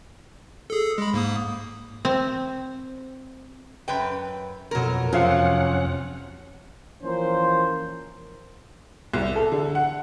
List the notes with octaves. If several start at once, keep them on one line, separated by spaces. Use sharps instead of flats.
G#4 A4
G#3 B5
G#2 A#3 D#6
C4
F#2 B4 G5
F2 B2 F#3 A#4
F2 C3 F3 F#3 C#4 F5 F#5
E3 F3 A#3 C#4 A#4 C5
C2
A4
D3
F#5